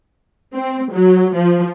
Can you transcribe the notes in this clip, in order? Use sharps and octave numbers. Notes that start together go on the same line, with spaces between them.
C4
F#3
F3